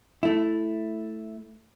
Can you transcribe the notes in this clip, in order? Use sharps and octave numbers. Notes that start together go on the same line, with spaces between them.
A3 E4